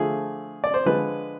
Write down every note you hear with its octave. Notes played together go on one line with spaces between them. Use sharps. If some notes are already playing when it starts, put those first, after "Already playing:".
Already playing: D3 F3 A3 G#4
D5
C5
D3 F3 G#3 B4